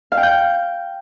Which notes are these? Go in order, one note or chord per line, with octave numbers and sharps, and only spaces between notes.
F5
G5
G6